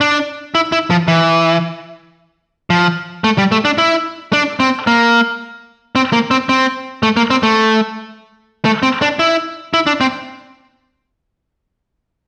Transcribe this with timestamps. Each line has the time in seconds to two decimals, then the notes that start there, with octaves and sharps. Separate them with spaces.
0.01 D4
0.55 E4
0.72 E4
0.90 F3
1.08 E3
2.70 F3
3.24 A3
3.38 G3
3.52 A3
3.65 D4
3.78 E4
4.33 D4
4.60 C4
4.87 A#3
5.96 C4
6.13 A#3
6.31 C4
6.49 C4
7.03 A3
7.17 A#3
7.30 C4
7.43 A3
8.65 A3
8.83 C4
9.02 D4
9.19 E4
9.74 E4
9.87 D4
10.01 C4